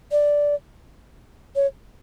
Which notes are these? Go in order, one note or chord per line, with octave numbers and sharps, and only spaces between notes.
D5
C#5